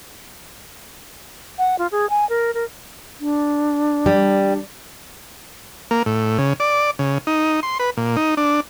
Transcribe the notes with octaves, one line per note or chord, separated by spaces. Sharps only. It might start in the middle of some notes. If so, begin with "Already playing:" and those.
F#5
F4
G#4
G#5
A#4
A#4
D4
G3
A#3
A2
C#3
D5
C#3
D#4
C6
B4
A#2
D#4
D4